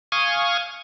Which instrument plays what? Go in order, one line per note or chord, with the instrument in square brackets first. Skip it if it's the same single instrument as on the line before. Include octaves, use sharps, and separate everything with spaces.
[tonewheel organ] F5 G#5 C#6 D#6